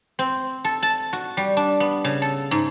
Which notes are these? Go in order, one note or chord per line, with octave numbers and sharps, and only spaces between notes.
C4
A4
A5
F#4
G3
D4
B3
C#3
A4
G#2